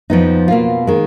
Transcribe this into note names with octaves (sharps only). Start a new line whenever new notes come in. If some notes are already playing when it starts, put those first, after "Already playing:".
F2 F3 B3 D#4
B2 A#3 F4
D#3 G#3